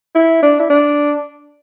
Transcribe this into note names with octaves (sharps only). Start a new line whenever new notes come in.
E4
D4
E4
D4